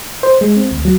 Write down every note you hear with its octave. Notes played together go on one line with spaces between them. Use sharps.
C5
G#3
C4
D2
F#3